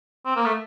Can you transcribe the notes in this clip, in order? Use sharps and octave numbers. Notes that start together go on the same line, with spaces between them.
C4
A#3
A3